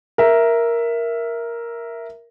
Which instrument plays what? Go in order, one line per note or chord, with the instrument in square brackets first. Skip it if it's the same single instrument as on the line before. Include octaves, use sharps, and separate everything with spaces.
[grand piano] A#4 E5